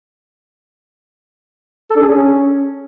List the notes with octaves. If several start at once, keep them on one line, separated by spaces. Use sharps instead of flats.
A4
D4
G#4
C#4